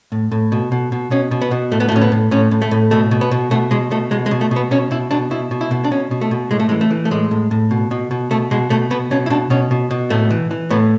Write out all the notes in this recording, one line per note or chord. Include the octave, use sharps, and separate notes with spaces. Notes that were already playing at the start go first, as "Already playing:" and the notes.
A2
A2
B2
B2
B2
B2 C#4
B2
B3
B2
A2 A3
B3
A3
A2 C#4
B3
A2
A2 C#4
A2
A3
A2
B2 A3
B2
B3
B2
B2 A3
B2 G#3
B2 A3
B2 G#3
G#3
B2
A3
B2
B3
B2 C#4
B2 E4
B2 D4
B2 E4
B2
E4
B2
D4
B2 C#4
B2
A3
B2
A2 G#3
A3
E3 G#3
A3
E3
A3
A2 G#3
A2
A2
B2
B2
B2
B2 A3
B2 G#3
B2 A3
B2 B3
B2 C#4
E4
B2 D4
B2 C#4
B2
B2
A2 A3
E3
E3
A2 B3